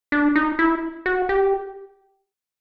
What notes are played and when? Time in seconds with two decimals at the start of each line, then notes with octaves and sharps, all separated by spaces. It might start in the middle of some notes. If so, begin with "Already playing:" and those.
0.12 D4
0.36 D#4
0.59 E4
1.06 F#4
1.29 G4